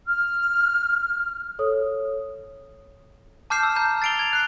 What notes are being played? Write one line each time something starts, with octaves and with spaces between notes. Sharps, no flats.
F6
A4 C#5 D#6
A5 D6 F6 G6 C7 E7
E6
A5 A#5 G6
A6 C7 D7 F7 G7
G#6 F7
F#6 C7